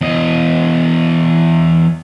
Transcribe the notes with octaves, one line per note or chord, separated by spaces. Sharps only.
E2 D#5